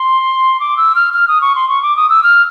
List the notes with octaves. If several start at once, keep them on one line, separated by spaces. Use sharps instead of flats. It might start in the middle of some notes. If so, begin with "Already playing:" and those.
Already playing: C6
D6
E6
F6
F6
D#6
C#6
C6
C#6
D6
D#6
E6
F6